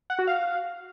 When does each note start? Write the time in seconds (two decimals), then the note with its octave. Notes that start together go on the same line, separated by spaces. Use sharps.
0.10 F#5
0.19 F#4
0.27 F5